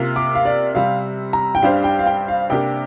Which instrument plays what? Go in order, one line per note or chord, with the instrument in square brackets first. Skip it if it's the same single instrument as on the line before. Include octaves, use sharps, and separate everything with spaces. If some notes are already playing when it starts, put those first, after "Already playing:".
Already playing: [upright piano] C3 A#3 F4
[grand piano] D6
F5
D5
[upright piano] C3 G3 C4 [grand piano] F5
[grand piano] A#5
G5
[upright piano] G2 G3 D4 G4 C5 [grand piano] F5
[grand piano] G5
F5
G5
F5
[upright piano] C3 A#3 D4 G4 [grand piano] G5